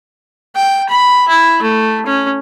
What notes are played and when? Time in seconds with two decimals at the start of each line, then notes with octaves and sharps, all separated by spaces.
0.56 G5
0.89 B5
1.28 E4
1.62 A3
2.06 C#4